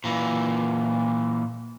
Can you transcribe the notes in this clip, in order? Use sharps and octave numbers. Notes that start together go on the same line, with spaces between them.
A#2 E3